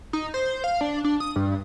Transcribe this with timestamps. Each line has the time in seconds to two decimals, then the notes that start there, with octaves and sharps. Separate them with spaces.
0.13 D#4
0.34 C5
0.64 F5
0.81 D4
1.04 D4
1.20 D#6
1.36 G2